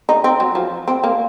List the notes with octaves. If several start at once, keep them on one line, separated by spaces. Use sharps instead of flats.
D#4
C4
F#3
F3
C4
A#3